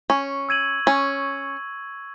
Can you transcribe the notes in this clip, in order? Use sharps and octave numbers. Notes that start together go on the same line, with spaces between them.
C#4 C#6
E6 G#6 D#7 F#7
C#4 C#6